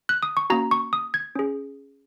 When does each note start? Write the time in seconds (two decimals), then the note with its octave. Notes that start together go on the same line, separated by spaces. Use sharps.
0.09 F#6
0.23 D#6
0.37 C#6
0.50 A#3 C#4 F#4 A#5
0.71 C#6
0.93 D#6
1.14 G#6
1.35 C#4 G#4